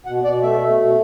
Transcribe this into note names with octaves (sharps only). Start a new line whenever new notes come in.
B2 F#5
B2 D5
A3 E5
A3
B2